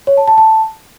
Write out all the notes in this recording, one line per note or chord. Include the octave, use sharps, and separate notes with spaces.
C#5
A5
A5
A5